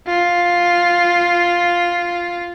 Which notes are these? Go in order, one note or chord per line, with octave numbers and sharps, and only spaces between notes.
F4